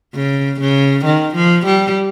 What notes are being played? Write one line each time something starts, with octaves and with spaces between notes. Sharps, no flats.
C#3
C#3
D#3
F3
G3